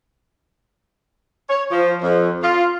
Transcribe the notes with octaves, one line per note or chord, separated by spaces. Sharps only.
C#5
F3
F2
F4